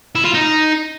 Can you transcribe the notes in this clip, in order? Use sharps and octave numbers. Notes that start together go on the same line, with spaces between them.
E4
F4
D#4